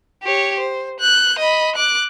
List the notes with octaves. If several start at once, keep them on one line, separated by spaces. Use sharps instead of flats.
G4 C#5
C5
F#6 G6
D#5 B5
D6 F#6